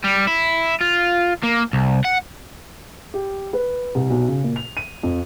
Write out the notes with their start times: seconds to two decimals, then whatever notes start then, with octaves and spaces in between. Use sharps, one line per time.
0.04 G3
0.27 E4
0.81 F4
1.43 A#3
1.73 C2
2.04 F#5
3.14 G4
3.53 B4
3.95 C2
4.10 B1
4.28 C#3
4.44 A#2
4.56 F7
4.77 D#7
5.03 F2